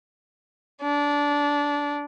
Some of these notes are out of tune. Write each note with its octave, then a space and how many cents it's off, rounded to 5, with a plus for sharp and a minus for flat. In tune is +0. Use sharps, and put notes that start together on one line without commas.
D4 -20